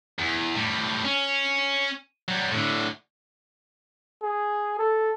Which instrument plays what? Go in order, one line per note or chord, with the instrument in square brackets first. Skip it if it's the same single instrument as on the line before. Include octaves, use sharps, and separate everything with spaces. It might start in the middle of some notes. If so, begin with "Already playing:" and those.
[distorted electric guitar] E2
A2 G3
C#4
F#3 G3
A2 D3
[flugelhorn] G#4
A4